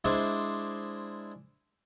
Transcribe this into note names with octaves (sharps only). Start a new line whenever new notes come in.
G#3 D4 E4 C5 D6